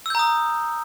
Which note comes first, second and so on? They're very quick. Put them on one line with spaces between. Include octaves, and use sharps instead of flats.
E6 G6 A#5 D#6